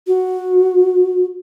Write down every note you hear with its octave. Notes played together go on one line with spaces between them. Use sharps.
F#4